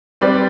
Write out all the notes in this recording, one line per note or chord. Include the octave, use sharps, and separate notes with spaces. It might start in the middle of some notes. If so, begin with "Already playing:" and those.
G3 C4 G4 B4 D5